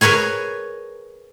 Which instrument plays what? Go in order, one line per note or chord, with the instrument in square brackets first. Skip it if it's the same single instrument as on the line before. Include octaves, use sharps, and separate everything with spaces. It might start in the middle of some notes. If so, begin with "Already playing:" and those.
[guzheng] G#4 A#4 B4 C#5 G#5